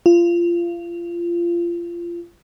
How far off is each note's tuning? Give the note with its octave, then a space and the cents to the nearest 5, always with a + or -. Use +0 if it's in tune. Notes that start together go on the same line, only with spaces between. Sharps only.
F4 -25